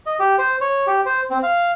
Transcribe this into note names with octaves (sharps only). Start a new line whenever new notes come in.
D#5
G4
C5
C#5
G4
C5
C4
F5